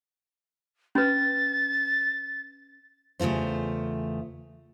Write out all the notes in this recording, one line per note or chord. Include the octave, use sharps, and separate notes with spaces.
C#4 B4 A6
E2 C#3 A3 F4 C5